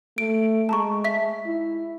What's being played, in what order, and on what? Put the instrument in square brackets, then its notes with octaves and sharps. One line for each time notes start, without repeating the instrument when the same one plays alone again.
[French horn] A3 [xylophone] D7
[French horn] G#3 [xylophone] A5 A#5 C#6
[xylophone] E5 B6
[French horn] E4